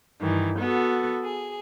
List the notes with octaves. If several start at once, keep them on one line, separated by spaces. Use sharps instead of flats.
G2 D#3 E3
B3 F#4 A4
G#4